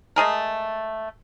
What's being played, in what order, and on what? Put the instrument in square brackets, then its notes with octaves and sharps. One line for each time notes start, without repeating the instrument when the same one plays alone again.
[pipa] G#3 A3 G#4 A#4